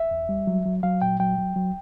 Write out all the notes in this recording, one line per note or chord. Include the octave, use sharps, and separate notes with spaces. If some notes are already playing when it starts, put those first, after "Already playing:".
Already playing: E5
E2
G3
F#3
F#3
F#3 F5
A#2 G5
F#3 G5
F#3
F#3